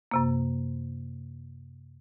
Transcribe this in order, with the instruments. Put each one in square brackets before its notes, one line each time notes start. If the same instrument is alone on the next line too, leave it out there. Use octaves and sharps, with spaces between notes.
[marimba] F#2 C3 A#3